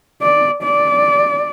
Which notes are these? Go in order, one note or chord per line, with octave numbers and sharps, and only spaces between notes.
D5
D5